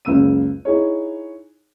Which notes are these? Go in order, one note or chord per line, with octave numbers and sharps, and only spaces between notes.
F#1 C#2 C#3 E6 D#7
D#4 E4 G#4 C#5